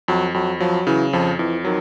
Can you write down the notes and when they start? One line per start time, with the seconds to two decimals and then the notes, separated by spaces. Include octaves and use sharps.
0.08 F2 F#3
0.34 F2 F#3
0.60 F3 F#3
0.87 C#3 E3
1.13 F2 F3
1.39 F2 E3
1.65 D#3 F#3